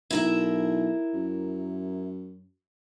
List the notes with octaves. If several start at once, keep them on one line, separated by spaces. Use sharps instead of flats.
B1 E4 A#4 E5
F#2